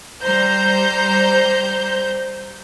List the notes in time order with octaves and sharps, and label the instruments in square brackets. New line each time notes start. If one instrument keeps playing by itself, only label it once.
[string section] G3 C5 A#5 G6